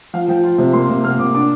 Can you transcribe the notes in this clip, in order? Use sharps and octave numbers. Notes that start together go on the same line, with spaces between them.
F3 F5
F3 G5
F4
C3
A#3 C6
C3
A#3 F6
C3 D6
D4 D6